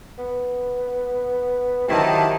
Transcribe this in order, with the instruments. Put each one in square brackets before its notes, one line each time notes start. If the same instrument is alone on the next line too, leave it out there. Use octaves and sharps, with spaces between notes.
[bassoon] B3
[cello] D#3 [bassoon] F3 [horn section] F#3 E4 G4 [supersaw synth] A5